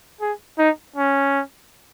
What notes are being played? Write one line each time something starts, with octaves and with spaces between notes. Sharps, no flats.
G#4
D#4
C#4